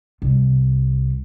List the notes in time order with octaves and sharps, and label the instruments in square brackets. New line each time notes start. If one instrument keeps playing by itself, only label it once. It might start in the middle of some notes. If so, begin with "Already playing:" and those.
[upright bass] C2